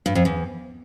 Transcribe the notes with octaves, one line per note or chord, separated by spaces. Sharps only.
G2
F2
E2